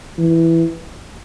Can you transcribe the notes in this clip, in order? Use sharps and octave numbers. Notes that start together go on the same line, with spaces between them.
E3